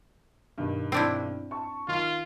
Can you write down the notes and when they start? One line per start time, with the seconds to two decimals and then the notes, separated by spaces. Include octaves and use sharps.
0.58 G2 B2 D#3
0.92 C4 D4 E4
1.51 A5 C#6
1.88 D#3 F4